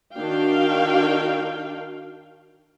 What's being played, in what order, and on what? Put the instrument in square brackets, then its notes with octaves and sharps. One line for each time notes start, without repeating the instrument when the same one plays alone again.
[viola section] D#3 D4 F#4 F5 G5